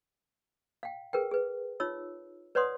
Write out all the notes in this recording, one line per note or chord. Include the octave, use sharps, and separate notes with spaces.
F5 G5
G#4 A#4 B4 G5
G#4 B4
D#4 F4 C#5 E6
B4 C#5 D5 F#5 C6 D#6